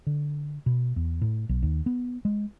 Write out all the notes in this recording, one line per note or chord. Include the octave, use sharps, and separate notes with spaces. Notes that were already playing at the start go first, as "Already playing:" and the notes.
D3
B2
E2
A2
B1
D#2
B3
G#3